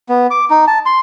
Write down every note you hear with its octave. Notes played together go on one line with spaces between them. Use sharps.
B3
D6
D#4
A5
C6